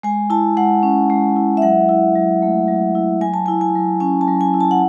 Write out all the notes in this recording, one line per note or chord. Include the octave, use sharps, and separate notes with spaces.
G#3 G#5
E4 A5
G#3 F#5
C#4
G#3
E4
E5
F#3 F#5
E4
F#3
A3
F#3
E4
F#3 G#5
A5
E4 G#5
G#5
F#3
C#4 G#5
A5
F#3
G#5
E4
A5
F#5